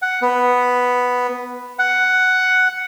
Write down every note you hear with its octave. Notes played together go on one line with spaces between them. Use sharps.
F#5
B3
F#5